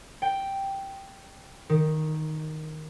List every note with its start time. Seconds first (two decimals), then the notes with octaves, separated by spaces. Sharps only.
0.22 G5
1.70 D#3